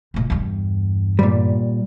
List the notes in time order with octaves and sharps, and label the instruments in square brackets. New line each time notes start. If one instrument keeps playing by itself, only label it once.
[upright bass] C#2 A#2
E2 G2
[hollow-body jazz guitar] A#2 G3